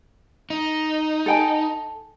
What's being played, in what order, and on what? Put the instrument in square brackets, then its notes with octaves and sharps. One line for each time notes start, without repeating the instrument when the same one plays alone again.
[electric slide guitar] D#4
[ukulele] A4 G5 G#5